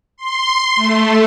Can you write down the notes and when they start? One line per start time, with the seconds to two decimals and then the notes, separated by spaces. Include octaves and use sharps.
0.17 C6
0.76 A3